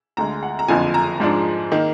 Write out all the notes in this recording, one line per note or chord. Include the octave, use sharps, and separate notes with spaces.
D2 D3 G#3 A#5
F#5
A#5
F#1 F2 D3 F3 G#5
A#5
G#2 F3 G#3 D4
D#3 A#3 D#4